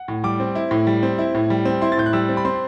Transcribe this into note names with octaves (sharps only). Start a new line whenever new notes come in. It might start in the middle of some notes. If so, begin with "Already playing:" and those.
Already playing: F#5
A2
G3 D6
C4
E4
A2
G3
C4
E4
A2
G3
C4
E4 C6
A6
A2 G6
F#6
G3 E6
C4
B5
C4 C6